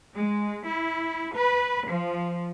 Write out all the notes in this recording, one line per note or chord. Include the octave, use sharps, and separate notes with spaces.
G#3
E4
B4
F3